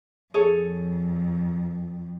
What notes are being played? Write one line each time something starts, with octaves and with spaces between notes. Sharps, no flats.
F2 G#4 A4 C#5